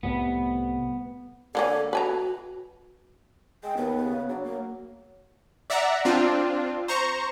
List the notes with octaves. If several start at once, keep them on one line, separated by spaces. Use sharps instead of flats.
C2 A2 C3 B3
D3 A#3 C#4 A4
F#4 B4 G#5 A#5
G#3 G5
D#2 B3
C#3
F#3 D4
A#3
D5 E5 F#5 A#5
C4 D4 F4
C5 A#5 C#6